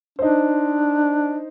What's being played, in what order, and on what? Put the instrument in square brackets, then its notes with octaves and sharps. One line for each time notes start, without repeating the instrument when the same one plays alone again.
[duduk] D4 [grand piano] D#4 C5